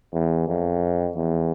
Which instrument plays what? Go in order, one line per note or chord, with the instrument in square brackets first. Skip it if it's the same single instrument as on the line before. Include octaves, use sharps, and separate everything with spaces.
[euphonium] E2
F2
E2